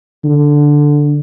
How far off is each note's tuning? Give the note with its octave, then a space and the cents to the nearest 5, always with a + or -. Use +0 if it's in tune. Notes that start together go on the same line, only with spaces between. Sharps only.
D3 +0